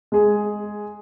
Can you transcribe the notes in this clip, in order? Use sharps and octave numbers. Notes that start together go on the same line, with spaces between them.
G#3 G#4